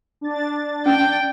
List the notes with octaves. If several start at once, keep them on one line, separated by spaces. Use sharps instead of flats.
D4 A6
C#4 G5